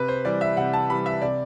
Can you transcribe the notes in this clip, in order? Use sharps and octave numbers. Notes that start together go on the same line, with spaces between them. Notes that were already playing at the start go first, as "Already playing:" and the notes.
Already playing: C3 B4
C5
E3 G3 D5
E5
C3 F#5
A5
E3 G3 B5
E5
C3 D5